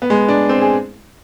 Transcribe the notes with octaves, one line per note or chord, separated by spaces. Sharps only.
B3
G#3
D4
C4
G#4